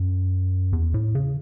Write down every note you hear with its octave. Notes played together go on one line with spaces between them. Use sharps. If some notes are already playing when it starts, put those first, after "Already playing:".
Already playing: F#2
E2
A2
C#3